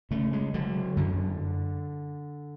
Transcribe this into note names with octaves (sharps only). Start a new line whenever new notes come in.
C#3 A3
G#3
D3 F#3
F#2 D3